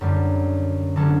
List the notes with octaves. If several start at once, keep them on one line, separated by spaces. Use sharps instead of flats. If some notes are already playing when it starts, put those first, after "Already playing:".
F#2 D3 G3
D3 F#3 C#4 F#4 A4